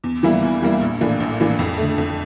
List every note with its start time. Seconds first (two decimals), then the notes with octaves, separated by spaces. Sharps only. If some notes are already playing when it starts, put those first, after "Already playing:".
0.04 E2
0.23 E3 G3 A#3 E4
0.42 E2
0.62 E3 G3 A#3 E4
0.81 A#1
1.01 A2 E3 A#3 D4
1.20 A#1
1.40 A2 E3 A#3 D4
1.59 F2
1.78 D3 A3
1.98 F2